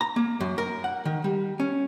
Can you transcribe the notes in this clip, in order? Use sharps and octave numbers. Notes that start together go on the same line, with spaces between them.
A#5
A#3
F#2
A#4
F#5
D#3
G3
C#4